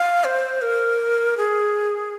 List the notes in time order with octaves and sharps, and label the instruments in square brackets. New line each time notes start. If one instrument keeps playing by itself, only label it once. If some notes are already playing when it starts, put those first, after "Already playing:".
Already playing: [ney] F5
C5
A#4
G#4